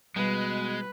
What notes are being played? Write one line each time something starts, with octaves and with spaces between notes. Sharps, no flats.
B2 G3 G#3 B4